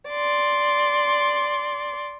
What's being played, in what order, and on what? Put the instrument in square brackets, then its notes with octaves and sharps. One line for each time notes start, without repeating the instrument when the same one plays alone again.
[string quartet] D5 C6